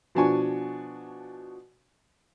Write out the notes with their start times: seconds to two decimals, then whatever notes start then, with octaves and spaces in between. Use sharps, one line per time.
0.15 B2 F3 D4 F#4 G#5 C#6